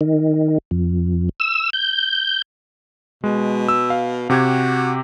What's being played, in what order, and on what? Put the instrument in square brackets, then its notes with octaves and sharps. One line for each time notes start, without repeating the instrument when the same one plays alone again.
[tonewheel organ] D#3
F2
E6
G6
[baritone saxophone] B2 [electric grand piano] G#3
[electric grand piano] E6
F5
[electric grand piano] C3 G4 G#6 [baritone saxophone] F#4